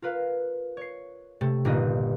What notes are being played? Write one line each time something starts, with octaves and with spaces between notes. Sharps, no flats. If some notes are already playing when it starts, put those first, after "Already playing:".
F4 A#4 B4 F5
C#5 C7
C3 A3
G1 A#2 A#3 B3 D#4 D#5